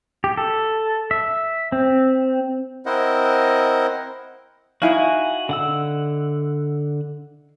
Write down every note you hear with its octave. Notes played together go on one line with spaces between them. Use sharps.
G4
A4
E5
C4
C4 E4 A#4 C5 D#5 F#5
D#4 E4 F#4 F5 G#5
D3 F#5 E6